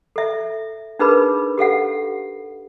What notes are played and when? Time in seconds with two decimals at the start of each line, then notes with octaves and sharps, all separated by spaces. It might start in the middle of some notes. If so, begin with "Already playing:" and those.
0.16 A4 E5
0.99 D4 D#4 G#4 A#4 B4 B5
1.58 G4 A4 F5 F#5